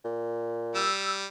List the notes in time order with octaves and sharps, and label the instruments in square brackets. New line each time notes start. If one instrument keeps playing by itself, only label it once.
[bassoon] A#2
[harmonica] G3 [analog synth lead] E6